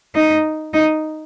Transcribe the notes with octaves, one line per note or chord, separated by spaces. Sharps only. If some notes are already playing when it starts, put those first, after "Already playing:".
D#4
D#4